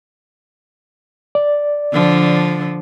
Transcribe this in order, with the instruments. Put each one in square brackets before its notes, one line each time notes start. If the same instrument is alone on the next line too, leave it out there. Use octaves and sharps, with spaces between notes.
[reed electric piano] D5
[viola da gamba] D3 F3